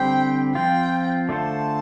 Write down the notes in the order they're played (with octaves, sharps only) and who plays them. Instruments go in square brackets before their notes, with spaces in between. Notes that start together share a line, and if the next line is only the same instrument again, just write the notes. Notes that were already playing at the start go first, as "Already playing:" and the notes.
Already playing: [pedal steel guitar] D3 G3 C4 G4 C5 [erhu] G5
[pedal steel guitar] F3 C4 F4 [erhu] G5
[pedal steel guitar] D3 A3 F4 A4 C5 [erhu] A5